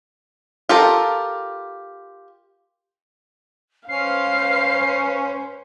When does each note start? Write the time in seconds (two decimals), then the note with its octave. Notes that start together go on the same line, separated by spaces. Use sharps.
0.69 F4 G4 A4 A#4
3.89 C#4 B4 C5 F5 C7